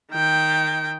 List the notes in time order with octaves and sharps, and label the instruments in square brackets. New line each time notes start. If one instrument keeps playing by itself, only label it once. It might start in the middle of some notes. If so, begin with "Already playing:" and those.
[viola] D#3 G5